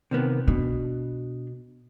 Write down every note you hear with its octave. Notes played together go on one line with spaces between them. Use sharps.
C3 D#3 B3
B2 D4